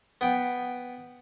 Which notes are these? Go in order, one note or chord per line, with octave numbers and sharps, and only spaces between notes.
B3 G5